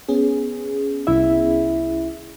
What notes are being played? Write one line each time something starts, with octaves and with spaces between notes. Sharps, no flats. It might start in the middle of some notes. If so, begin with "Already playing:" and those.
B3 C#4 G#4
C2 E4 E5